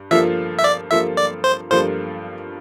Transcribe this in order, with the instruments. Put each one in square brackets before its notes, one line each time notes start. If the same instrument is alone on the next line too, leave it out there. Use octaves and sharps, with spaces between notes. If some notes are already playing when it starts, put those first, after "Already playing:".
Already playing: [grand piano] G2
[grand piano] G2 F3 A#3 F4 A4 [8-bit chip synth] E5
[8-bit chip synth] E5
D5
[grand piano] G2 F3 A#3 F4 A4 [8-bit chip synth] E5
[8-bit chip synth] D5
C5
[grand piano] G2 F3 A#3 F4 A4 [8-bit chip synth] C5